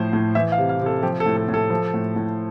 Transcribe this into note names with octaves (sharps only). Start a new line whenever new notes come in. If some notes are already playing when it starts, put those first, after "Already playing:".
Already playing: A2 F3 C5
A2
E3 E5
F5
C3
F5
C3
A4
F3 G4
A4
A2
A4
A2
A4
F3
A2
A2